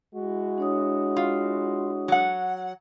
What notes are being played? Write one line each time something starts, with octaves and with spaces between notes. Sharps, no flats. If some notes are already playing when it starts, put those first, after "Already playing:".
G#3 E4 F#4
D4 C#5 D#6
F4
F#3 F#5